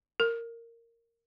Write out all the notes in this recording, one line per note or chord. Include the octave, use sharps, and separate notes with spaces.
A#4